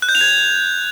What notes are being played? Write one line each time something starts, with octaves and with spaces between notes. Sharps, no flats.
F#6
G6
F7
G#6